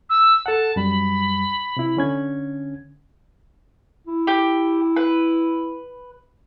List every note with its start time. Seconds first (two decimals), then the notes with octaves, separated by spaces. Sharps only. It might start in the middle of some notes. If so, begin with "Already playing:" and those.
0.10 E6
0.46 A4 F#5 A5
0.76 F#2 G3 B5
1.77 C3 E4
1.97 D3 C#4 G#6
4.07 E4
4.27 G4
4.96 B4